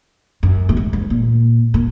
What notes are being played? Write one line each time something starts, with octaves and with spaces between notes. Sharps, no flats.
F#2
A#2
G#2
G#2
A#2
A#2